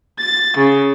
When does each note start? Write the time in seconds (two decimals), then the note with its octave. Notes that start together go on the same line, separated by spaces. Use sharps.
0.19 A6
0.57 C#3